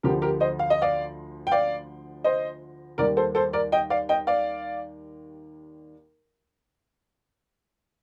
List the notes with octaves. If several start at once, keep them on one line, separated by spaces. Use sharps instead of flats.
D2 D3 F3 G4 A#4
G4 A#4
C5 D#5
F5
D#5
D5 F5
G5
D5 F5
C5 D#5
D#2 D#3 G3 A#4 D5
A4 C5
A4 C5
A#4 D5
D#5 G5
D5 F5
D#5 G5
D5 F5